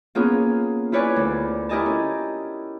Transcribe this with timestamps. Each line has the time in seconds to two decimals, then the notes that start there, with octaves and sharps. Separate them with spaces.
0.15 A#3 B3 C#4 F4 G#4
0.92 E4 F4 B4 C#5 D5 G#5
1.16 D2
1.69 E4 G4 A#4 D#5 G#5 A5
1.86 C#4